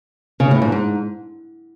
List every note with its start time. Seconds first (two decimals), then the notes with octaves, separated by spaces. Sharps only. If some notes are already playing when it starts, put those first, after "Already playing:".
0.40 C#3
0.51 A2
0.62 G#2
0.72 G#2